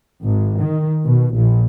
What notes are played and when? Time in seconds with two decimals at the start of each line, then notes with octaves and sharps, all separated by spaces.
0.23 G#1
0.61 D#3
1.05 B2
1.35 A#1